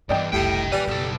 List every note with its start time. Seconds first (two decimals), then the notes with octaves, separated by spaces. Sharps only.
0.09 B1 E2 G2 D5 D#5 G5
0.33 F1 B1 A2 G3 D#5 G5
0.72 A#2 G3 B4 D5 G#5
0.88 F#1 B1 B2 A4